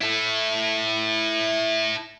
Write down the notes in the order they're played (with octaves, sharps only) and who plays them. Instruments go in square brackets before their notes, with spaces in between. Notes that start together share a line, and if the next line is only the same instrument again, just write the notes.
[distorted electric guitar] E4 A4